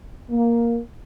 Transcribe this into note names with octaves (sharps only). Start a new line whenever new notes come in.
A#3